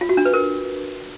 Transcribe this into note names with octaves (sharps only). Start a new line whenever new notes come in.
F4
F#4
D4
B4
A#4